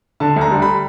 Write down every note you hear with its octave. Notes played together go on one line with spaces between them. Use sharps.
D3 A5
D2 A#5
G3
B5